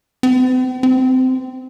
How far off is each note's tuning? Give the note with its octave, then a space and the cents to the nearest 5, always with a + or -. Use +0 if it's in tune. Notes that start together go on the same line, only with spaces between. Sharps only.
C4 -45
C4 -20